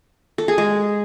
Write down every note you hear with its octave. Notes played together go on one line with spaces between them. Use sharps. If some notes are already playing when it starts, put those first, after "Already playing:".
A4
G#4
G#3